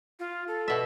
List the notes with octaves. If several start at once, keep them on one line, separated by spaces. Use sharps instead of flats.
F4
A4
B2 E5